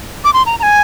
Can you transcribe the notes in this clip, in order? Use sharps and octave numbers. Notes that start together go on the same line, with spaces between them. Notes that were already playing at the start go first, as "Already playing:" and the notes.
D6
C6
A#5
A#5
G#5